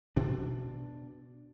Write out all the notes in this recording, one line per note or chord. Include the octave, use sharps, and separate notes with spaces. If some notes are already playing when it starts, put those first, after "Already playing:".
B2 D4